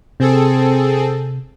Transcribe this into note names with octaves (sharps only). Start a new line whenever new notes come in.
C3 C4 G#4 A4